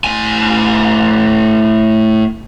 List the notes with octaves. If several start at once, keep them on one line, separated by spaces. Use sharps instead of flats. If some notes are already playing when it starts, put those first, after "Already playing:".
A2 G#5